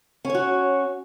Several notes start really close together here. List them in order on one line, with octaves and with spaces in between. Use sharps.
C#4 C#5 F#4